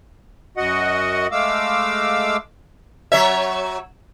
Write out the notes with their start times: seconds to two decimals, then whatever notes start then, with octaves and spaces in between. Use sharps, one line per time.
0.57 F#2 F#4 D#5 F#5
1.32 G#3 A3 F5 D6 E6
3.12 F#3 C#5 E5